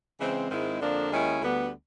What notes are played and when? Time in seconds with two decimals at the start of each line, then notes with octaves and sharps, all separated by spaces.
0.20 C#3 E3 G#3 C4
0.50 G#2 D#3 G#3 C4 E4
0.80 F2 D3 F3 A#3 D4
1.10 D#2 D#3 G#3 C#4 E4
1.41 D2 D3 G3 B3